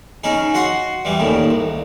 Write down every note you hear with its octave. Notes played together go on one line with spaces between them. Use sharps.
C#3 C#4 D#4 G#4
F#4 F#5 C6
E3 G3
D#2 A2 C#3
C2